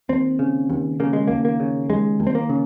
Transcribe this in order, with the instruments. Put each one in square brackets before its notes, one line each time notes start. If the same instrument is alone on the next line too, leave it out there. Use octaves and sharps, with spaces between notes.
[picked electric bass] D#2 C4
C#3
D#2
C#3 A#3
G#3
D#2 A#3
A#3
C#3
D#2 G#3
D#2
C4
A#3
C#3